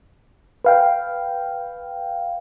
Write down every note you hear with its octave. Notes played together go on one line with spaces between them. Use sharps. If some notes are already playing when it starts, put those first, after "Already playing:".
B4 F5 G5